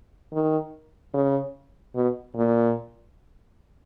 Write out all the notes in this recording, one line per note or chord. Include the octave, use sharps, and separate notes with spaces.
D#3
C#3
B2
A#2